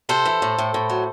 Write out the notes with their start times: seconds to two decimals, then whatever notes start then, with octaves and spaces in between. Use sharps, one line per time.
0.09 C3 A4 C5
0.25 E3
0.42 A2
0.58 A2
0.74 A2
0.90 F#3